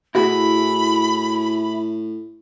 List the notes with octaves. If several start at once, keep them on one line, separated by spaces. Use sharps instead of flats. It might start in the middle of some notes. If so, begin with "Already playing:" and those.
A2 E4 F#4 G#4 B5